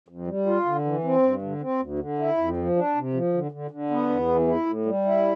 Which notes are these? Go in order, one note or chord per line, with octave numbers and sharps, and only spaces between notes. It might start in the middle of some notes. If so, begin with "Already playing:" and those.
F2
G3
F4
D3
E3
C4
G2
D3
C4
D2
D3
E4
F2
F3
D4
C3
F3
D3
D3
D3
B3
E2
E3
E4
A2
G3
E4